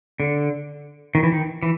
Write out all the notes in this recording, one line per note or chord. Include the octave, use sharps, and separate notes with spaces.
D3
D#3
E3
D#3
E3